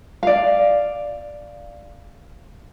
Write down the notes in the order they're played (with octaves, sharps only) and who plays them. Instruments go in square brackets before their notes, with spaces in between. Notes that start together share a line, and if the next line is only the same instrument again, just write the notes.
[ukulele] D5 F5